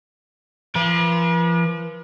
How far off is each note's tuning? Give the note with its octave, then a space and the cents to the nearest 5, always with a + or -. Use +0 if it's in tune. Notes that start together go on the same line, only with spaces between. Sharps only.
F3 -40 B4 -45